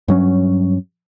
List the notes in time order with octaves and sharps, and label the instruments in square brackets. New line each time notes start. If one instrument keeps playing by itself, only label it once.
[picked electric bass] G2 F#3 C#4